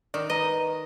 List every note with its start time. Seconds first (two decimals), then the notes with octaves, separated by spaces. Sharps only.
0.14 D#3 D5
0.30 B4 D#5 A#5